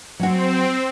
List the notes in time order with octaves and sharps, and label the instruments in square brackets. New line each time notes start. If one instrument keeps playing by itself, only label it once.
[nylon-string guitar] F#3 F#4 [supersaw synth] C4